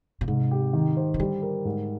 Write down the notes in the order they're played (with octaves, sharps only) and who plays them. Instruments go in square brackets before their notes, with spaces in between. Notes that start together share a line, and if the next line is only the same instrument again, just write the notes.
[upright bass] A#2
[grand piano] G#2 [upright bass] C3
[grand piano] G4
D#3
C5
[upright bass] D#3
[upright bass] D3 [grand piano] G3
[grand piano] A#4
G#2